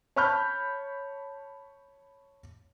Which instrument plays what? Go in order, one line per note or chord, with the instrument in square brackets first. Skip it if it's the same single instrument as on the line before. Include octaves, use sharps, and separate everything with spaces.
[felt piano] C#5 A5 B5 C#6 F6 G6